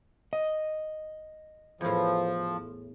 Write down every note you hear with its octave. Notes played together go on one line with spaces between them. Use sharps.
D#5
E2 A2 F3